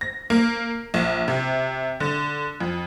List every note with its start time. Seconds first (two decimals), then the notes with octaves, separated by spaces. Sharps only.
0.01 A#6
0.30 A#3
0.94 A#1
1.28 C3
2.00 D3
2.61 F2